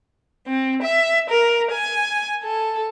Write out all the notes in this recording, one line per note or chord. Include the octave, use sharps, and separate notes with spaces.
C4
E5
A#4
G#5
A4